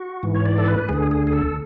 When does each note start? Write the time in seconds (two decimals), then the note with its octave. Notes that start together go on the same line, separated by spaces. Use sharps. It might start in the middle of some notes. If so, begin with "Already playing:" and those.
Already playing: F#4
0.23 G#2 E3
0.35 C#5
0.45 D5
0.58 A4
0.68 B4
0.89 D2 D3 G#4
1.11 G#4
1.27 G#4
1.33 A4